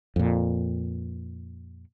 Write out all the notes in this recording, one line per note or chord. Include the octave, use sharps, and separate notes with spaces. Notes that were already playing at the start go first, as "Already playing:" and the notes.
F2 A#2